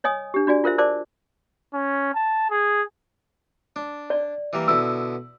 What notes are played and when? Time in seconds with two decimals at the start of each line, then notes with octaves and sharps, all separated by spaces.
0.04 C#5 D#5 G#5 D#6
0.34 D4 G4
0.47 D4 F#4 D5 G#5
0.64 F4 A#4 C5 E5
0.78 A#4 C5 D5 A5 D6
1.73 C#4
2.14 A5
2.50 G#4
3.76 D4
4.10 D5
4.53 E3 G3 A#3
4.68 B2 D3 E4 E6